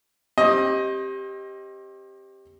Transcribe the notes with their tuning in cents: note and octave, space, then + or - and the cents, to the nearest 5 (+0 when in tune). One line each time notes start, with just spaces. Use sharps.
C4 +40 G4 +0 D#5 +15